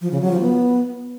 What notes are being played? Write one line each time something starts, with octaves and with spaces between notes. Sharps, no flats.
F3
C#3
F#3
F3
B3